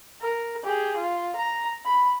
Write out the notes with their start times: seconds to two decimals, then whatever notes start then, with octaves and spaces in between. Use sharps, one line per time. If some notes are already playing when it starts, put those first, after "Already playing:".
0.21 A#4
0.64 G4 G#4
0.97 F4
1.36 A#5
1.86 B5